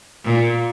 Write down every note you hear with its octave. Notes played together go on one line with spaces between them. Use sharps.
A#2